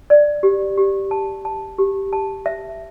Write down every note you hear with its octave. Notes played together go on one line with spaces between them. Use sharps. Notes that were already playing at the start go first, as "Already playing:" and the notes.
D5
G4
G4
A5
A5
G4
A5
E5